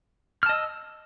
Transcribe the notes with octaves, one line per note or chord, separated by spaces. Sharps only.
D#5 A5 E6 F6